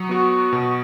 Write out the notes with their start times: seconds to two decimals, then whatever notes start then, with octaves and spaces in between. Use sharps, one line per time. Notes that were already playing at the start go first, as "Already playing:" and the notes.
Already playing: F#3 C#6 D#6
0.09 B3 F#4
0.53 B2